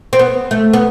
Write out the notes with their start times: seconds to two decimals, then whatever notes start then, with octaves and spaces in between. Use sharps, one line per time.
0.13 C4
0.19 B3
0.51 A3
0.73 B3